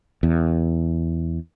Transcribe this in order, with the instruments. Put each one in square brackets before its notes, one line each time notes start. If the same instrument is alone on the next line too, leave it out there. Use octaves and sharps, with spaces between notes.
[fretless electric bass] E2